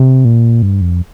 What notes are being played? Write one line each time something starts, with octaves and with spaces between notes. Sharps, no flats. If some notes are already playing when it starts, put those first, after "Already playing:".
Already playing: C3
A#2
G2
F2